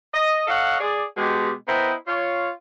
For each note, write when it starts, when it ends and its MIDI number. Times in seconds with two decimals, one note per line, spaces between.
0.14 0.45 75
0.48 0.79 69
0.48 0.79 73
0.48 0.79 75
0.48 0.79 77
0.48 0.79 78
0.80 1.03 68
0.80 1.03 74
1.17 1.51 47
1.17 1.51 56
1.17 1.51 67
1.68 1.93 59
1.68 1.93 64
1.68 1.93 70
1.68 1.93 72
1.68 1.93 75
1.68 1.93 79
2.08 2.50 65
2.08 2.50 73